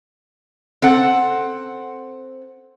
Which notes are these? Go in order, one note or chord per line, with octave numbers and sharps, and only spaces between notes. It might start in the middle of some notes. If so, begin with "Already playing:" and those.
C4 A4 F#5